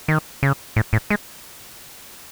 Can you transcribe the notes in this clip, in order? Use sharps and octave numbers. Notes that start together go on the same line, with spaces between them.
D#3
C#3
A2
A2
G#3